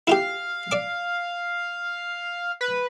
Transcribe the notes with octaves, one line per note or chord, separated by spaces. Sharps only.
E4 F4 G4 F5
D5 D6
B4